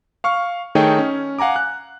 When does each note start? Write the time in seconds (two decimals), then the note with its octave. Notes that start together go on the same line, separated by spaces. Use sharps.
0.24 F5 C#6 F6
0.75 D#3 A3 D#4 G#4 C#5 G5
0.99 C#4
1.39 F5 F#5 G#5 A#5 D6
1.56 F#6